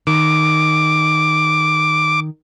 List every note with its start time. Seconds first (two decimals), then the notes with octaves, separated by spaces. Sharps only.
0.07 D#3 D6